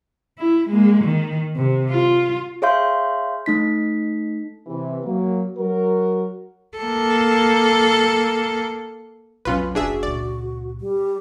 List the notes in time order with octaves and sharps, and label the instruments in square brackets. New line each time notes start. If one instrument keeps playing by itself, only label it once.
[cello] E4
G#3 A#3
D#3
C3
F4
[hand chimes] G#4 C#5 E5 F5 C6 G6
A3 D#4 B6
[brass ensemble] C3 E3
F#3 A#3
F#3 F#4 A#4
[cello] A#3 A4
[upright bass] B1 F2 [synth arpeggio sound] C#4 F4 B4
[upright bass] F#1 A#3 [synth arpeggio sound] D4 G#4 E5 [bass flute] F#4
[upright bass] C#2 A#2 [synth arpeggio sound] D5
[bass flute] G3